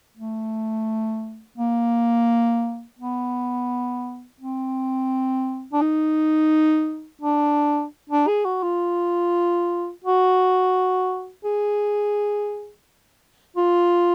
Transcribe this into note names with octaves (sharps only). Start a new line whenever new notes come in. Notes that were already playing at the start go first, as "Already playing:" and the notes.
A3
A#3
B3
C4
D4
D#4
D4
D4
G#4
F#4
F4
F#4
G#4
F4